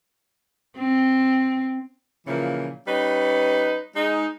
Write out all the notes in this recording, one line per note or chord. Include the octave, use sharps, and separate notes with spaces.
C4
A#2 C#3 E3 F3 A#3
G3 C#4 D#4 B4
G#3 D#4